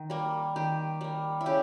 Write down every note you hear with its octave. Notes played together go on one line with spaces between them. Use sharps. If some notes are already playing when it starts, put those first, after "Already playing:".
Already playing: D#3
G3 A#3
D#3 G4
G3 A#3
E4
C#3 G4